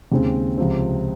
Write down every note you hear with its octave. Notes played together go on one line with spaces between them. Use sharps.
D#2 C#3 G#3 C4
C#2 C3 F3 C4